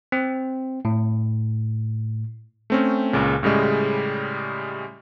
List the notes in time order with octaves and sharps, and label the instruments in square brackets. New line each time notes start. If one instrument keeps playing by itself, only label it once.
[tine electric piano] C4
A2
[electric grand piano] A3 C4 C#4
C#2 A#2 C#3
A2 C#3 G3 G#3